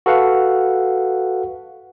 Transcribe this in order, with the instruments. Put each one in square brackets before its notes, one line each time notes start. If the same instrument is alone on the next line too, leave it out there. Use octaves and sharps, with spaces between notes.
[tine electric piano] F#4 A4 B4 F5 F#5